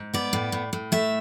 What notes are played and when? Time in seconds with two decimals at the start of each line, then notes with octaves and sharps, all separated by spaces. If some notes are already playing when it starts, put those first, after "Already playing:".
Already playing: G#2
0.14 B3 D5
0.33 A2
0.52 A2
0.73 A2
0.92 A3 E5